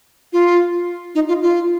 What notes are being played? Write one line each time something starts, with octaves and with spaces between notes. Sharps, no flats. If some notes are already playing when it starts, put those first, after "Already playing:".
F4
D#4
F4
F4